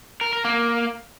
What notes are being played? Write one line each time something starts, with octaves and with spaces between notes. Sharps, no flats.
A#4
A#4
A#3